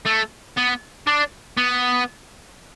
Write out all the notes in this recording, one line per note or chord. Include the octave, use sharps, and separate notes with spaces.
A3
B3
D4
B3